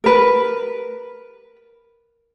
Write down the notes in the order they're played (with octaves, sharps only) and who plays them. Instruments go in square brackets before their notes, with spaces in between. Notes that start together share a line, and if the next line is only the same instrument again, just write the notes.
[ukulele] A#4 B4